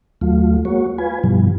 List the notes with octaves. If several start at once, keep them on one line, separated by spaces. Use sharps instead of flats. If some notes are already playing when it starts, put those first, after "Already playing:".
D#2 F#3 A3 F4
G#3 A#3 F#4 C#5
F4 B4 G#5
G2 B2 E3 F3 G3